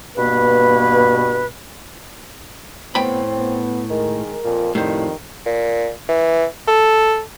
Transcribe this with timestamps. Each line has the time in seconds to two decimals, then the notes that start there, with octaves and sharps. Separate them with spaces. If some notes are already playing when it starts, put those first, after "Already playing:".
0.17 G2 B2 A#3 B4
2.95 A2 B3 C4 G5 B5
3.37 B3
3.90 D#3 G#3 A#4
4.45 F2 A#2
4.75 F2 A2 D#3 G3 C5
5.46 A#2
6.09 E3
6.68 A4